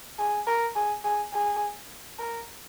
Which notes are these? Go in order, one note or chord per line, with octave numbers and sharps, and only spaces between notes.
G#4
A#4
G#4
G#4
G#4
A#4